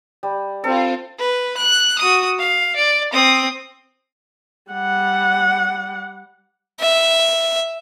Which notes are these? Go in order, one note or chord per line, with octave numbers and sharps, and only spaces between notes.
G3
C4 F4 A4
B4
F#6
F#4 D#6
F5
D5
C4 D#6
G3 F#5
E5